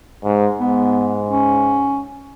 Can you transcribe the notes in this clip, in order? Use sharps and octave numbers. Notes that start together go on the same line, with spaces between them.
G#2
G#2 B3
C#4